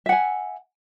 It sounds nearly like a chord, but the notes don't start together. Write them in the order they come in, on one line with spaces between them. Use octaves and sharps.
E5 F#5 G#5